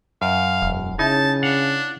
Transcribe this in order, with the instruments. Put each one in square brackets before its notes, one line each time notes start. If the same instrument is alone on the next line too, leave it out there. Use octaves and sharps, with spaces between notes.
[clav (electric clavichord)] F#2 [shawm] F5
[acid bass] E1
[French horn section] C#3 [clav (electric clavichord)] D#4 [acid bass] E4 [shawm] A5
[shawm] D4 [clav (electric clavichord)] F5 F#5